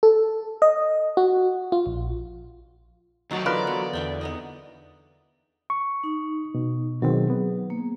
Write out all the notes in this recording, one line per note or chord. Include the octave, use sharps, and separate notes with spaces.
A4
D#5
F#4
F4
A#1
D2 D#3 F#3 D#4 F#4 A5
D3 E3 B3 F4 A#4 B4 D5
B3
E2 D3 E5 G5
B3 D#4 D#5
C#6
D#4
B2
B2 D#3 F#3 C4 G#4
B3
A#3